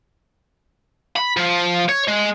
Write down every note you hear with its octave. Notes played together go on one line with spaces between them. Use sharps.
B5
F3
C#5
G#3